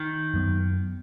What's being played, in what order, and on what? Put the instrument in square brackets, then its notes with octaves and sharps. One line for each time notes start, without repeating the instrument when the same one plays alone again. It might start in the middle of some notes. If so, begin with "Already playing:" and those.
Already playing: [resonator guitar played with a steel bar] D#3
[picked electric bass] F#2 F#3 B3